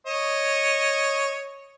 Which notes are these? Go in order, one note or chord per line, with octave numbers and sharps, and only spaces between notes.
C#5 D#5